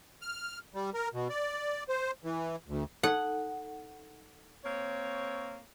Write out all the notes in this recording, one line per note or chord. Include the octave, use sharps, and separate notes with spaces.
F6
G3
A#4
B2
D5
C5
E3
D2
D#4 A4 F#5
A#3 C4 C#5